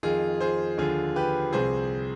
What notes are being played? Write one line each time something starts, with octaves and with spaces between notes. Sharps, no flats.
F2 D#3 F4 G#4
G#4 C5
D#2 D3 F3 F4 G#4
G4 B4
C2 C3 F3 G#4 C5